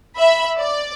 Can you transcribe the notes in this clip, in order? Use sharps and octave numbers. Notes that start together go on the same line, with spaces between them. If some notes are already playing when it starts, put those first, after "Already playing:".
E5 B5
D5